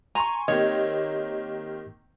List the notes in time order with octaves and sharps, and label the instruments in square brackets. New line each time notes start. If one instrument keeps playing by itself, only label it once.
[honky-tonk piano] G#5 C6 C#6 [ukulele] A#5
[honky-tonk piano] D#3 A#3 C4 [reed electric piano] G4 D#5 [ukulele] C#5